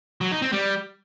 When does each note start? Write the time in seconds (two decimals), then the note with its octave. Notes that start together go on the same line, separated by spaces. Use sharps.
0.21 F#3
0.31 D#4
0.42 C4
0.52 G3